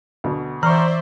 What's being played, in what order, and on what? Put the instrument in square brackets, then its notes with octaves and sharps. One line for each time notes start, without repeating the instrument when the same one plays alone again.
[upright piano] D2 B2
[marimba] E3 [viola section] C5 D5 E5 [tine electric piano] A#5 C#6